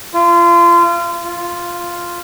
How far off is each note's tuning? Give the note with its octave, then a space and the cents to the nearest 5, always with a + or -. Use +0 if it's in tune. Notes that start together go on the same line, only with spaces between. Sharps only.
F4 -30
F4 -5